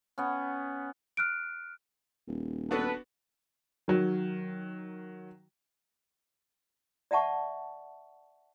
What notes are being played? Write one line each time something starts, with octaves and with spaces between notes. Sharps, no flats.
B3 C#4
F6 F#6 D7
D#1
B3 D4 F#4 A4 B4
D#3 F#3
D5 E5 F#5 A5 C#6